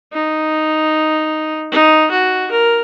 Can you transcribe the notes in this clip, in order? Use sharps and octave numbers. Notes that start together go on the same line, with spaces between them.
D#4
D#4
F#4
A#4